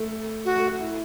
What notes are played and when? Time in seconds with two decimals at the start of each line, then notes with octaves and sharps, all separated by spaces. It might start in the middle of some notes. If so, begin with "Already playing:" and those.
Already playing: A3
0.45 F#4
0.56 A3
0.68 F#4
0.80 E4